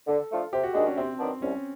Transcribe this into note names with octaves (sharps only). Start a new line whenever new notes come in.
D3 A4
F3 A3 D4 F4
C3 G4
F#4
D#3 G#3 D4
C#4
C3 C4
D#3 F#3 B3 D4
C2 C#4